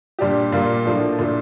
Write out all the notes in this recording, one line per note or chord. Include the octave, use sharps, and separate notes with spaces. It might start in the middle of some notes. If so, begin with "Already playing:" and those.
A#2 G3 D4 G4
A#2 G3 A#3 F4
A2 F3 A#3 D4 F4
A#2 A3 D4